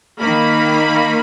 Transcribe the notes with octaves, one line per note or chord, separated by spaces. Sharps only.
D#3 A#3 B5